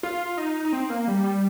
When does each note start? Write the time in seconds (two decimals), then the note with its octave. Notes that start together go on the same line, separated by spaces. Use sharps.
0.03 F4
0.38 D#4
0.65 D#4
0.73 C4
0.90 A#3
1.08 G3
1.24 G3